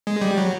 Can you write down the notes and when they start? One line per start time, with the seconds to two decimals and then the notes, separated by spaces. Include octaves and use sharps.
0.07 G#3
0.21 G3
0.37 F#3